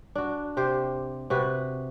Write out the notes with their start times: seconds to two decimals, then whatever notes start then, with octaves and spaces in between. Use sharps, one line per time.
0.15 D4 F#4
0.57 C3 G4 C5
1.30 C3 F#4 B4